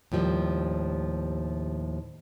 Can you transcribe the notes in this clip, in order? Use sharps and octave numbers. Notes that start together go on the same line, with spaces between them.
D#2 A2 F3 G3